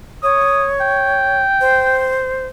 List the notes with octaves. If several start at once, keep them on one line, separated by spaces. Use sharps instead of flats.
C#5 D#6
G5
C5